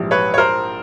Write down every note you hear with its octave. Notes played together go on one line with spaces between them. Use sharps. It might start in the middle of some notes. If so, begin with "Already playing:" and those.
Already playing: A#1 G#2 E3 G3
B4 C#5
C#5
A#4 C5